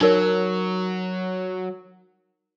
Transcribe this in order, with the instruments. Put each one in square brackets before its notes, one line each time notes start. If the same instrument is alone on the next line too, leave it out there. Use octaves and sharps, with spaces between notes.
[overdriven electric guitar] F#3 [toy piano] D#4 A#4 C#5